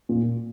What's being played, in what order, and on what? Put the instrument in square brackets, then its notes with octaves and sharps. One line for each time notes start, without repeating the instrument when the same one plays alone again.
[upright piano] A#2